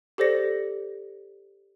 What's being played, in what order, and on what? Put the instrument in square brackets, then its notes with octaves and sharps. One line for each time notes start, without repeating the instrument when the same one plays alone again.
[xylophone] G4 A4 C5 D5 A#6 C#7